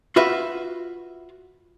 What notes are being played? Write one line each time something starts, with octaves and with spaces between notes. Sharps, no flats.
F4 F#4 B4 E5